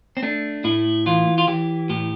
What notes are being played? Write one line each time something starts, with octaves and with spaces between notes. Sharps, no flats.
C4
A3 D4
A2 E4
E3 F4
F4
E3 G4
A2 G4